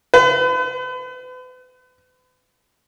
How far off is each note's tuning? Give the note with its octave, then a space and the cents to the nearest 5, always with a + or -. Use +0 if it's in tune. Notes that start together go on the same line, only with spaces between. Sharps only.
B4 +40